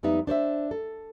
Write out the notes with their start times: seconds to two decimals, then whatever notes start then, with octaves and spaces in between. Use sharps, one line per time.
0.03 F2 G3 B3 D#4 E5
0.27 D4 C5 C#5 E5
0.71 A4